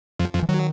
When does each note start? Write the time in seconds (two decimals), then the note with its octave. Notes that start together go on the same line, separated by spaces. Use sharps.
0.19 F2 F3
0.34 F2 F3
0.42 E3
0.49 D#3 F#3